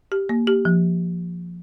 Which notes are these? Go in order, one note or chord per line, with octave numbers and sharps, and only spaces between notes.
G4
A#3
G4
F3